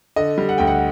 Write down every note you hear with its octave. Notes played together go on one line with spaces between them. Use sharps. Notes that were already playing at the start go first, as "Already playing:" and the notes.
D3 D#5
G3
F#5
D2 G5
F#5